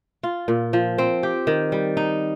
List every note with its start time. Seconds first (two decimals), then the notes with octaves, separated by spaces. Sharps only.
0.23 F4
0.48 A#2
0.73 F3
0.98 C4
1.23 G4
1.47 D#3
1.72 G3
1.97 D#4